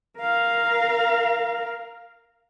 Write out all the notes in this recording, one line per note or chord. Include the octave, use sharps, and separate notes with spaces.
A#4 F5